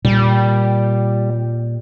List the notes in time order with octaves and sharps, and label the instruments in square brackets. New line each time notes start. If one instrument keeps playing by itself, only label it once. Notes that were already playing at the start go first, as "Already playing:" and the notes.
[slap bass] A#2 [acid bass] G3